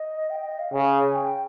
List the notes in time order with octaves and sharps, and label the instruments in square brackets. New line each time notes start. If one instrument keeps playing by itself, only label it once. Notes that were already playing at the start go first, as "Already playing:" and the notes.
Already playing: [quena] D#5
G5
D#5
F5
[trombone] C#3 [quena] G#5
[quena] G5